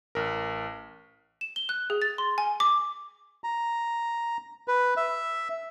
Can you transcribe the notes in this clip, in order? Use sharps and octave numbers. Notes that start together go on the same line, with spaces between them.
A1 A#4
E7
G7
F#6
G#4
A6
C6
G#5
D6
A#5
B4
E5